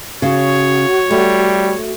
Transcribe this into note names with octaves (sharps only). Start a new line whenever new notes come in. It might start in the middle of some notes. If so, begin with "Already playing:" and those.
C#3 F#4 C#5
G3 A3